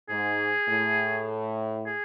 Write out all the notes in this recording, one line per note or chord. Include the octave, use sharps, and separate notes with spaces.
G#2 G#4
A2
G#4